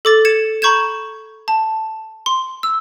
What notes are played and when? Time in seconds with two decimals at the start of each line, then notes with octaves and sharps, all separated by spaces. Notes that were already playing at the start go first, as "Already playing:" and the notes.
0.05 A4 D6 A6
0.25 G#6 C#7 E7
0.62 A#5 B5 C#6 G6 G#6 E7
1.48 A5
2.26 C6
2.63 E6